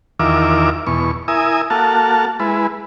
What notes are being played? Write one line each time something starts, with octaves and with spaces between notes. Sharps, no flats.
E2 D#3 F4 A#4 E5 D6
E2 B2 C#6
E4 A#4 E5 G#5 D#6
A#3 F#4 A4 F5 A5
G#3 E4 B4